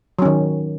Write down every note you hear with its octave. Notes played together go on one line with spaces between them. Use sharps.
D#3 F#3 C#4